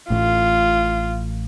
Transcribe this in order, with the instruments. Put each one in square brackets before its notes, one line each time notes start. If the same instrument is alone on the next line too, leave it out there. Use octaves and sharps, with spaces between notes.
[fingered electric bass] A1 A2 [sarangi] F4